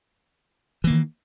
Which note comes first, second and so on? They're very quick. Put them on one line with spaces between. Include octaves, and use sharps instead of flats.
E3 A#3 D#3